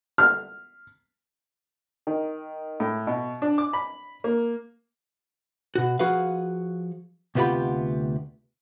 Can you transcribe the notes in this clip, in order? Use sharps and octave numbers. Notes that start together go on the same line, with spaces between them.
F6
D#3
A2
B2
D4
D6
B5
A#3
B2 F#4
F3 F#4 G#4 B4 F5
D2 C3 B3 F4 G4 B5